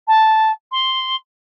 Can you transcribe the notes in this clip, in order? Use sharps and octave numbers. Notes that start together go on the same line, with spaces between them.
A5
C6